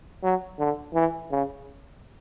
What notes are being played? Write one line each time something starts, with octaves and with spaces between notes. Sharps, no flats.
F#3
D3
E3
C#3